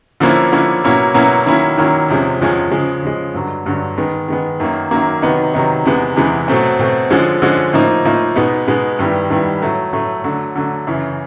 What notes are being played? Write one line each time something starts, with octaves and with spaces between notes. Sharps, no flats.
D3 F3 A#3 C#4 E4
D3 F3 A#3 C#4 E4
B2 F#3 A#3 C#4 E4
B2 F#3 A#3 C#4 E4
D#3 F#3 A#3 C#4 E4
D#3 F#3 A#3 C#4 E4
E2 C3 F3 G#3 C#4
E2 C3 F3 G#3 C#4
C#3 F3 G#3
C#3 F3 G#3
G2 D3 F#3
G2 D3 F#3
D#3 G#3 B3
D#3 G#3 B3
F#2 D#3 F#3 A#3
F#2 D#3 F#3 A#3
C3 D#3 F#3 B3 D#4
C3 D#3 F#3 B3 D#4
E2 C3 E3 G#3 B3
E2 C3 E3 G#3 B3
B2 F#3 A3 C4
B2 F#3 A3 C4
D3 F3 G#3 C#4
D3 F3 G#3 C#4
A2 F3 A#3 D#4
A2 F3 A#3 D#4
B2 G#3 B3 D#4
B2 G#3 B3 D#4
G2 D#3 G3 B3 E4
G2 D#3 G3 B3 E4
A2 F#3 A3
A2 F#3 A3
D3 F#3 A3
D3 F#3 A3
F#2 C#3 E3